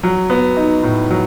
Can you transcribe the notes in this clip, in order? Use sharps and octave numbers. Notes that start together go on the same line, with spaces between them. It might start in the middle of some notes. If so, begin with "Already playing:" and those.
F#3
B3
D#4
A2
F#3